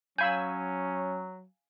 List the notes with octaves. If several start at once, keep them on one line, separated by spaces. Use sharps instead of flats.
F#3 C#4 F5 G#5 B5 E6 G6